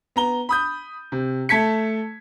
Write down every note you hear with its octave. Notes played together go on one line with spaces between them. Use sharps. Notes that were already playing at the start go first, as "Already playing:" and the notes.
B3 A#5 G7
B5 D#6 G6
C3
A3 A5 G#6 B6 C#7